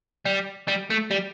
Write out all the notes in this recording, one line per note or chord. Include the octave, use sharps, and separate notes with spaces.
G3
G3
A3
G3